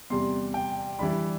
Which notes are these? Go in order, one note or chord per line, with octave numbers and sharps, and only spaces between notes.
E2 C3 G3 C6
G5
E3 G3 D4 B5